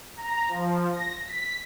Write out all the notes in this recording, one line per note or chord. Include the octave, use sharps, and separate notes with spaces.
A#5
F3
A#6
B6